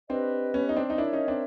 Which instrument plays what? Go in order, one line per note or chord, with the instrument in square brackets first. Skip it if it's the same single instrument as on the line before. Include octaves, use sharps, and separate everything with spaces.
[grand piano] C4 D4 [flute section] G4 B4 D#5
[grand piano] B3 C#4
D#4
C4 D4
D#4
[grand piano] D4 E4 [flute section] A#4 C#5 E5
[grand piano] C#4 D#4
C4 D4